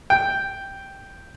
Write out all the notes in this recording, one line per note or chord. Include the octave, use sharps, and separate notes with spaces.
G5